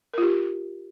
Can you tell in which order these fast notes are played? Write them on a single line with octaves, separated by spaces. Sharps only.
A#4 F4 G4